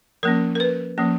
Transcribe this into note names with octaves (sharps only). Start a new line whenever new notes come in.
F3 A#3 C#4 A#4
A#4
B4
F3 A#3 C#4